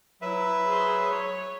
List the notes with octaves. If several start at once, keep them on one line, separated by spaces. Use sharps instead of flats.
F#3 E4 B4 E5
G#4 C5
C#5